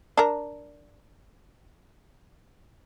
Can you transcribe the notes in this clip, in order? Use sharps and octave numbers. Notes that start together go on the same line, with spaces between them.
D4 A#4